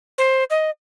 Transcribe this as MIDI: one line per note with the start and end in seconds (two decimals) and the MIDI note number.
0.18 0.44 72
0.50 0.70 75